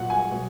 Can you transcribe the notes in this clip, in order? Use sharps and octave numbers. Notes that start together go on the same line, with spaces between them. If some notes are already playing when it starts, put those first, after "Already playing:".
Already playing: A#2 F#3 F#5
G#5
B2 F#3